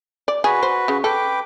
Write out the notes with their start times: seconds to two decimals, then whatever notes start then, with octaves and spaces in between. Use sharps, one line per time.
0.28 D5
0.44 F#4 G#4 B4
0.63 C5
0.88 C#3
1.04 A4 B4 G5 D6